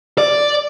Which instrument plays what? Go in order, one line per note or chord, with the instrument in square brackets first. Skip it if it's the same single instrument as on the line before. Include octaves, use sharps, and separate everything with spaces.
[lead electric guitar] D5